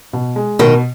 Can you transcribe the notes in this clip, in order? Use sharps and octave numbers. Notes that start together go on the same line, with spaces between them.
B2
G#3
B2 D#3 D#4